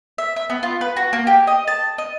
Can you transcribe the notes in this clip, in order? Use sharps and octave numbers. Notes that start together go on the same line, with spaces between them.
E5
E5
B3
F4
B4
F#4
A#3
G4
D#5
A5
D#5